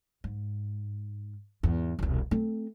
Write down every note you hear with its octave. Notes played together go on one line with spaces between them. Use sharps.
G#2
E2 G#2
E1 C2
A3 C4